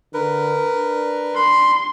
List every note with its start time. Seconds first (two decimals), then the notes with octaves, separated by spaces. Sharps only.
0.14 D3 A#4 B4
0.73 D4
1.36 B5 C6